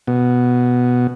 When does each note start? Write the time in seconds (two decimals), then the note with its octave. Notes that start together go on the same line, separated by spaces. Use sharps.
0.07 B2